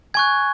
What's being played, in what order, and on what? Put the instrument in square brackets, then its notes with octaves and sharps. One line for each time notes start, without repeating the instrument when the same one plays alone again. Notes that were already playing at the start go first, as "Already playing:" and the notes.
[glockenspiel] G#5 C#6 F#6 G#6